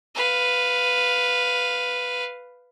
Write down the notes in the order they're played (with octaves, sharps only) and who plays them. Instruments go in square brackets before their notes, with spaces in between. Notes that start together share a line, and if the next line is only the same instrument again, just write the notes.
[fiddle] B4 F5